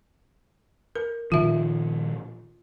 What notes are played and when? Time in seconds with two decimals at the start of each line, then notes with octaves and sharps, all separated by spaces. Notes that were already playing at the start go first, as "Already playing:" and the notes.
0.96 A#4
1.32 A#2 D#3 F3 F4 E5